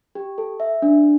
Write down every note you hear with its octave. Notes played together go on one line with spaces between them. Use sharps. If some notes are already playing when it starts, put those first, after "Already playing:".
G4
A4
E5
D4